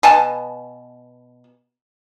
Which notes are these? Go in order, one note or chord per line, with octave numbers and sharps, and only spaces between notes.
B2 G#5 A5